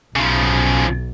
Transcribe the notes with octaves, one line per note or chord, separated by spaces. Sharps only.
B1 C#3 F3